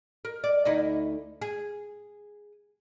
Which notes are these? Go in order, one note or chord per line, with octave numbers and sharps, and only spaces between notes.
A#4
D5
D2 D#4 E4
G#4